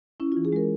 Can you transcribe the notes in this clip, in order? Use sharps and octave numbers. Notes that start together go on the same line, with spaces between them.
C#4 E4
F4
E3
G#4
G#3 A#4